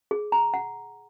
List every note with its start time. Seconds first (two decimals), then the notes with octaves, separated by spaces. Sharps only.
0.11 G#4
0.32 A#5
0.54 F#5